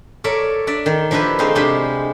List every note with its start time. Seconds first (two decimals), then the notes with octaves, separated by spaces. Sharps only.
0.24 A4 A#4 C#5 D5 E5
0.67 D4 D5 E5
0.86 D#3
1.11 F3 D4 E4 G4 B4
1.39 G#3 A3 C4 D#4 F5
1.55 C3 G#3 D4 G4 B5